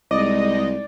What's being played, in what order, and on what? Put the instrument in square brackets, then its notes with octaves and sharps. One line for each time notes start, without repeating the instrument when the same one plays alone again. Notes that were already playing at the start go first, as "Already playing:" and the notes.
[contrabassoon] C2 [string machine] G#3 D#4 [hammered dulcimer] D5 [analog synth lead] D#5